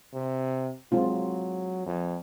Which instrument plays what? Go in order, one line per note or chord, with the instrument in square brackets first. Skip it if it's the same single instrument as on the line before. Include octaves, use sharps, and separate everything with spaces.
[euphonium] C3
[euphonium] F#3 [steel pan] G#3 C4 F4
[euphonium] F2